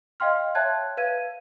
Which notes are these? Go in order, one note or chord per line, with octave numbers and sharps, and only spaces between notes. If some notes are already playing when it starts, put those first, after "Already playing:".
D#5 F5 G5 C6 F6
C#5 E5 G5 A5 F#6 G#6
B4 F5 G#6 D#7